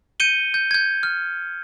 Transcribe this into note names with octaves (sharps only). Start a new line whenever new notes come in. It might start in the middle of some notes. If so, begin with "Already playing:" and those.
G6 C#7 D#7 G7
G6
G6 G#6
F6